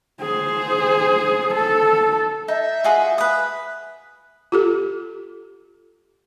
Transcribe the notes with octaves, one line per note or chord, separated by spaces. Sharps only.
G#4 C5
A4
D#4 E5
F4 F#4 G#4
B4 D#6
F4 G4 A4